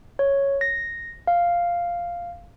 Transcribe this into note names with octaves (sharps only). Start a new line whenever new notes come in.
C#5
A#6
F5